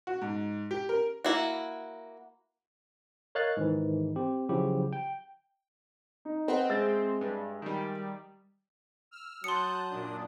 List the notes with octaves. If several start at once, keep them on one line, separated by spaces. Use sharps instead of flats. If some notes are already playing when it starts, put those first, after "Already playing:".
F#4
G#2
G4
A#4
A#3 E4 F#4
A#4 C#5 D#5 F5 F#6 A6
G#2 D#3 E3
C4 G4
C#3 F3 F#3 E4 G4
G5
D#4
C4 B4 D#5 F#5
G#3 E5 E6 A6
G2
D#3 G3
E6 F6
F#3 A5 C6 D#6 F#6 G6 C#7
F#2 A#2 D4